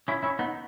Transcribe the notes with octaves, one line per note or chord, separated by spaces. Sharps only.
C#4 E4
C#4 E4
B3 D#4